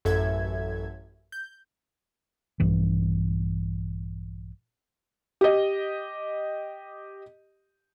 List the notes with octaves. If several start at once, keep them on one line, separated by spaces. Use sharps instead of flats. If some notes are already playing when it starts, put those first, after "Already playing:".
A1 F#2 A4 E5 G#6
G6
A#1 G2 E3
G4 D#5